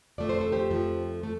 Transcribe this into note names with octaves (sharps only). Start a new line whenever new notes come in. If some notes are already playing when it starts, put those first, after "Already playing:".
F2 F3 A3 D5
C5
A4
G4 C5
F2 F3 A3
A3